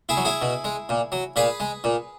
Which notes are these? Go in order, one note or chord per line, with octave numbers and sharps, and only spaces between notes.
E4 G#4
F#3
E4 G#4
B2
G#3
A#2
F#3
A#2 G#4 B4
G#3
A#2